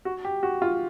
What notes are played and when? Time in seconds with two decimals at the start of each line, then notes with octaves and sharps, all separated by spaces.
0.05 F#4
0.25 G4
0.43 F#4
0.62 F4